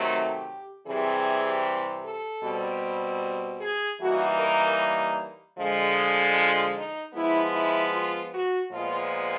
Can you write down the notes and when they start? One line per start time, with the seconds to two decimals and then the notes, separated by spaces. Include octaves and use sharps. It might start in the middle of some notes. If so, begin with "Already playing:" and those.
Already playing: C3 D#3 F#3 A3
0.08 G4
0.86 C3 E3 G3 C4 G#4
2.04 A4
2.43 B2 G3 C4
3.61 G#4
4.00 E3 G3 A#3 D#4 F#4
4.39 A#4
5.57 D3 F3 G#3
6.35 F4
6.76 D#4
7.14 F3 G#3 B3 E4
7.54 E4
7.92 F4
8.32 F#4
8.71 A#2 F3 G#3 B3 F4